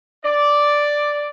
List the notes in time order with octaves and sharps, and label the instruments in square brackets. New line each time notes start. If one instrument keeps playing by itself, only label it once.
[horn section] D5